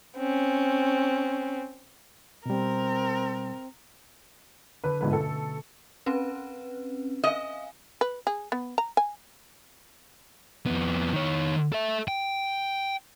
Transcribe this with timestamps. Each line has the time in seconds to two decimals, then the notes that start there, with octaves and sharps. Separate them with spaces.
0.18 C4 C#4
2.46 B2 G3 C4 A#4
4.84 D3 B4
5.01 G1 G#2 B2 A3 C#4 B4
5.13 A4
6.06 C4 C#4 B4
7.24 D#5 F5 G#5
8.01 B4
8.27 G#4
8.52 B3
8.78 A#5
8.97 G#5
10.66 F2 B3
11.13 D#3 C#5
11.72 A4 E5
12.08 G5